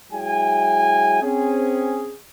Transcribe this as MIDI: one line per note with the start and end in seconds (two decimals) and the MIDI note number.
0.13 1.22 54
0.13 1.22 56
0.13 1.22 64
0.13 1.22 79
0.13 1.22 80
1.23 2.14 60
1.23 2.14 61
1.23 2.14 68